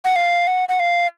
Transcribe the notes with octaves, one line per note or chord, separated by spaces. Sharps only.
F#5
F5
F#5
F#5
F5